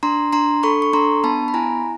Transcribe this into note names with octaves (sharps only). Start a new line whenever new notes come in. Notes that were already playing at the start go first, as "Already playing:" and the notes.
D4 A#5 C6
D4 A#5 C6
A4 B5 C#6
C#6
D4 A#5 C6
B3 A5 B5
B5
E4 G#5 A#5